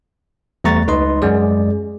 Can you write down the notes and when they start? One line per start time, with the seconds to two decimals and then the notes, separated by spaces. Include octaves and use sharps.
0.64 E2 G3 A3 A#5 C#6 A6
0.88 C#2 D#4 B4 D#5 C6
1.22 F#2 G#3 G#4 D5